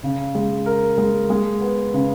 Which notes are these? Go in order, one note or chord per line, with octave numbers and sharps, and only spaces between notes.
C#3
G#3
A#4
G#3
G#3
B3
C#3